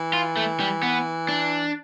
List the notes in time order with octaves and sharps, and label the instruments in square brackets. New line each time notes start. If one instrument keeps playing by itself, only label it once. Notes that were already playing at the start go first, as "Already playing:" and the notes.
Already playing: [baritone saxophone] E3
[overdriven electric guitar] F4
A3
G3
B3
D4